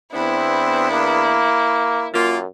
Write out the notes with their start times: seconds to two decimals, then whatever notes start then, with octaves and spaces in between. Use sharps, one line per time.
0.13 E2 B3 C4 D4 E4
0.91 A#3
2.14 F#2 A#3 F4